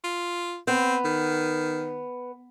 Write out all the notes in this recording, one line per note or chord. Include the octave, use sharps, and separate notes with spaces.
F4
B3 C4
D#3